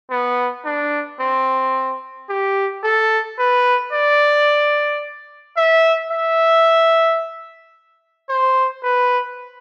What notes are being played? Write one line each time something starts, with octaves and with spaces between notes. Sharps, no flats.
B3
D4
C4
G4
A4
B4
D5
E5
E5
C5
B4